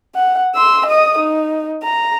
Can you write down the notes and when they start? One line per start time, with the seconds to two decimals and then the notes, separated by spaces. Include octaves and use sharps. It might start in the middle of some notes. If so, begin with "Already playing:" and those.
0.15 F#5
0.55 C6 E6
0.86 D#5 D#6
1.19 D#4
1.82 A#5